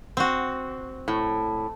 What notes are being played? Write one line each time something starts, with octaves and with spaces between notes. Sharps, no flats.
C4 F#4
A2